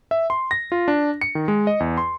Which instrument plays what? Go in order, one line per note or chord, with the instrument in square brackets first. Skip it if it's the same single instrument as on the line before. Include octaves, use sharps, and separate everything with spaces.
[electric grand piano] E5
C6
A#6
F4
D4
C#7
D#3
G#3
D#5
E2
C6